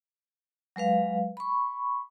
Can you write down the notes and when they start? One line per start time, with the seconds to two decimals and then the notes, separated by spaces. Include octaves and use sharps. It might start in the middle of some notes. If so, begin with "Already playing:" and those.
0.76 F#3 G#3 B4 F5
1.37 B5 C#6